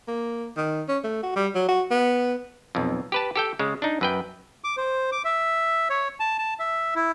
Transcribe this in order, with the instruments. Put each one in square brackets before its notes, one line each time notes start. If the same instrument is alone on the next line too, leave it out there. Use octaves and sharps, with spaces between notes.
[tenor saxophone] A#3
D#3
C#4
A3
F#4
G3
F#3
F#4
B3
[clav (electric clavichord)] B1 F2
G4 B4 A5
G4 A4 G5
C#3 G#3
D4 D#4
F#2 B4 G5
[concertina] D6
C5
D6
E5
C#5
A5
A5
E5
E4